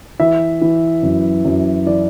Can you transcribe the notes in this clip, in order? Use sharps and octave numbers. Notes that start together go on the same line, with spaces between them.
E3 E5
E3
F#2
F#2
E3 D5